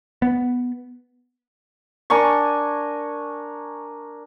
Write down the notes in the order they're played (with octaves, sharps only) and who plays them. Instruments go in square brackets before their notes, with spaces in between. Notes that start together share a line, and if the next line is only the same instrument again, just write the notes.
[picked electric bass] B3
[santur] D4 A#4 G#5 C#6